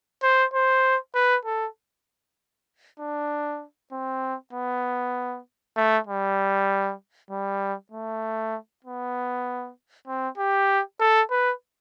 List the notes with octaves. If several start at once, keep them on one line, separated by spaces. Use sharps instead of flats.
C5
C5
B4
A4
D4
C4
B3
A3
G3
G3
A3
B3
C4
G4
A4
B4